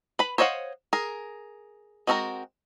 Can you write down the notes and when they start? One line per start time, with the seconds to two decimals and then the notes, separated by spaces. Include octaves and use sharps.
0.19 B4 B5
0.38 C5 C#5 D#5 F5 F#5
0.93 G#4 A#4
2.07 G#3 C4 F#4 A4 A#4